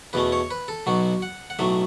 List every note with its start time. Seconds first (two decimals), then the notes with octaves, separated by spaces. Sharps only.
0.13 E2 B2 A3 C#4 B4
0.32 C#5
0.51 B4
0.68 A4
0.86 B1 B2 F#3 F#4
1.22 F#5
1.50 F#5
1.59 B1 A2 F#3 A3 E5